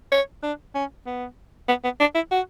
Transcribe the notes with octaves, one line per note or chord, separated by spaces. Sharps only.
C#5
D4
C#4
B3
B3
B3
D4
E4
F#4